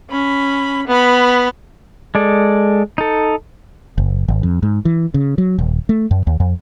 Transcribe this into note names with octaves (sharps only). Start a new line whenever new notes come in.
C#4 B5
B3 B5
G#3 A4 D5
D#4 A4
F#1
G#1
F2
G#2
E3
C#3
F#3
D#1
A3
F#2
D#2
F2